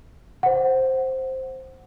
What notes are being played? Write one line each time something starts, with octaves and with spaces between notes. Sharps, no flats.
C5 F#5